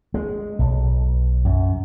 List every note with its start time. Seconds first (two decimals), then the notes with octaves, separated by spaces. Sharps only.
0.14 G#3
0.59 B1
1.45 F#2